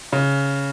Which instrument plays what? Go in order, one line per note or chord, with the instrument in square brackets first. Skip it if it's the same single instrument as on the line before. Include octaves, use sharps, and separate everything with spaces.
[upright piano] C#3